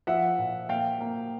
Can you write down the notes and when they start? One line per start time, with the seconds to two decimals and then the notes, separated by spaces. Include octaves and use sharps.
0.07 F3 E5 F#5
0.39 A#2
0.69 A#3 F5 G5
1.00 A#3